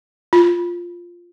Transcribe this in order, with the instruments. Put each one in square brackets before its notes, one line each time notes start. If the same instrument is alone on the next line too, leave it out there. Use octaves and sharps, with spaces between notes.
[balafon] F4